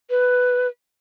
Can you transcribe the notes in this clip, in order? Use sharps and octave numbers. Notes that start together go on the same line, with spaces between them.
B4